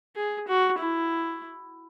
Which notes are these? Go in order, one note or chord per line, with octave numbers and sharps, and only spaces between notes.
G#4
F#4
E4